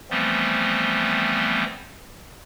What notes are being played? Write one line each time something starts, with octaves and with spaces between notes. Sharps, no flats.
E3 F3 G3 A3 B3 C4